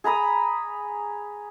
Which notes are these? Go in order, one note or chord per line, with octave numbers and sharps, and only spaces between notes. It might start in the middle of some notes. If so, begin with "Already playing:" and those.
G#4 A#5 B5 D#6